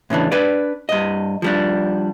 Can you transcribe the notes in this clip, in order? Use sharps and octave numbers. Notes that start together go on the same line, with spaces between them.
A2 C#3 E3 D4
D4 B4 D5
G2 D#5
F3 G3 D4